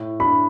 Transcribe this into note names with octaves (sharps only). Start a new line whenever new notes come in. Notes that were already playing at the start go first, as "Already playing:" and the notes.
Already playing: A2
D4 B5